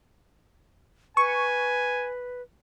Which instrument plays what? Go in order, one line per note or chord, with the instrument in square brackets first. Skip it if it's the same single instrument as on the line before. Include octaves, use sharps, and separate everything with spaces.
[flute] B4 [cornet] G#5 [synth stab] C#6